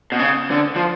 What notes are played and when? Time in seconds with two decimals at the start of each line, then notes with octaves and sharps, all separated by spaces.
0.12 B2
0.19 C#3
0.51 D3
0.76 F3